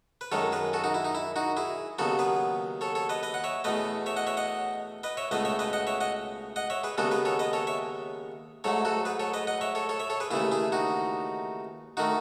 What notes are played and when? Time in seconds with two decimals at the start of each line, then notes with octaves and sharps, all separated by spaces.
0.21 B4
0.32 F#2 D#3 G#3 A4 C#5
0.52 G#4 B4
0.73 F#4 A4
0.84 D#4 F#4
0.94 E4
1.05 D#4
1.15 E4
1.36 D#4 F#4
1.57 E4 G#4
1.99 D#2 C#3 F#3 B3 F#4 A4
2.19 G#4 B4
2.81 A4 C#5
2.95 A4 C#5
3.09 B4 D#5
3.23 B4 D#5
3.34 F#5
3.44 C#5 E5
3.64 E2 B2 A3 B4 D#5
4.06 C#5 E5
4.16 D#5 F#5
4.27 C#5 E5
4.37 D#5 F#5
5.03 B4 D#5
5.17 C#5 E5
5.31 C#2 B2 A3 B4 D#5
5.45 C#5 E5
5.59 B4 D#5
5.73 D#5 F#5
5.87 C#5 E5
6.00 D#5 F#5
6.56 D#5 F#5
6.70 C#5 E5
6.84 G#4 B4
6.98 D#2 C#3 G#3 B3 F#4 A4
7.11 G#4 B4
7.25 A4 C#5
7.39 B4 D#5
7.53 A4 C#5
7.67 C#5 E5
8.64 G#2 F#3 A3 A4 C#5
8.85 F#4 A4
9.05 G#4 B4
9.20 A4 C#5
9.33 B4 D#5
9.47 D#5 F#5
9.61 C#5 E5
9.75 A4 C#5
9.89 A4 C#5
9.99 C#5 E5
10.10 A4 C#5
10.20 G#4 B4
10.31 D#2 C#3 E3 A3 E4 G#4
10.52 E4 G#4
10.72 D#4 F#4
11.97 D#3 A3 D#4 F#4